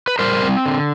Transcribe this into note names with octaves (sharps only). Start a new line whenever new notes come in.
B4
G3 A#4 C5
C4
D3